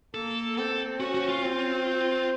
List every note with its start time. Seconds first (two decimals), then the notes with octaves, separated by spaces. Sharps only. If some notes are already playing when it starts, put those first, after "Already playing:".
0.14 A#3 A4
0.57 C4 A4
1.00 C#4 F#4
1.14 F#4
1.28 F4
1.42 C4